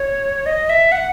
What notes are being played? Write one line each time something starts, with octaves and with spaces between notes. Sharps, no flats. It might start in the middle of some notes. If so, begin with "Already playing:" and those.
Already playing: C#5
D#5
E5
F#5